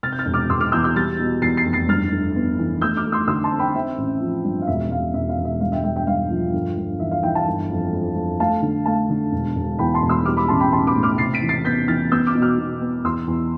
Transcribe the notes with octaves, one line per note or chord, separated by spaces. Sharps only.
C3 F6 A6
G6
F6 A6
E1
D6 F6
E1 C6 E6
D6 F6
E2 E6 G6
E6 G6
G3 F6 A6
B2
E2 A6 C7
A6 C7
F1
A6 C7
G2 F6 A6
G1
B3
E3
A3 E6 G6
D6 F6
A3
C6 E6
D3 C6 E6
A5 C6
C4
G5 B5
C4 E5 G5
A1
F3
G2
F5
E1 E5
E1 F5
E1 E5
F5
E1
E5
G2 F5
E5 G5
G2 E5 G5
E5 G5
G2 F5
F3
G1
G1
E3 E5
F5
E3 E5 G5
F5 A5
G1
F2
F2
F2
A3 F5 A5
D3
A3 F5 A5
D3
E1
E1
E2 G5 B5
A5 C6
E1
C6 E6
G3 D6 F6
B5 D6
A1 A5 C6
G5 B5
A1 A5 C6
B5 D6
A2
D6 F6
C3 A6 C7
B6 D7
E3
A6 C7
B3 G6 B6
E3 F6 A6
B3 E6 G6
D6 F6
B2
D6 F6
B2
B3
E2 C6 E6
E2